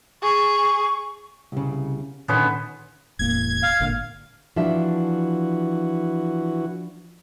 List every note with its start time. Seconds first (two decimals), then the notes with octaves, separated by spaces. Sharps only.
0.23 G#4 C#6
1.52 C2 C#3
2.28 A#2 D3 D#3 B3 C#4 C5
3.19 E1 A1 A#3 G#6
3.63 F5
3.80 G#1 A#2 D3
4.56 E3 F3 D4 F#4 E5